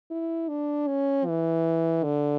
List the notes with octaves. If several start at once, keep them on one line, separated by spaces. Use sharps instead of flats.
E4
D4
C#4
E3
D3